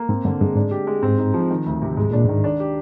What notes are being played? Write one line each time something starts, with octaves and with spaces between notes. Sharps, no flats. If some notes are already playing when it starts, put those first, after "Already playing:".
Already playing: A#3
G#2 C4
G2 D3
G2 G#3
G#2 D4
G4
G#3
G#2 C4
D#4
F3
D#3
D2
C3
G#2 G#3
A#2 D4
G#2 D#3
D4
G4